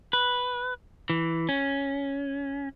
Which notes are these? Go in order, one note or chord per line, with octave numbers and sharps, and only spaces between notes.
B4
E3
C#4